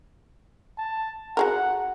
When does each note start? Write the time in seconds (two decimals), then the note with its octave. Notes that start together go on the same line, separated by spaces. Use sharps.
0.78 A5
1.37 F#4 G#4 A#4 F#5